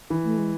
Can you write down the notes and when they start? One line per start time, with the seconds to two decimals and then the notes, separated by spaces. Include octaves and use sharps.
0.10 E3
0.24 A3
0.37 G#3